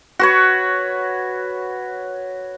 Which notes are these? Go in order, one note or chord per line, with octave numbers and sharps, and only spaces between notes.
F#4 B4 C#5